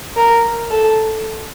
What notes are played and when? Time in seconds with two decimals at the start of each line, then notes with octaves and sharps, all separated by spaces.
0.17 A#4
0.71 A4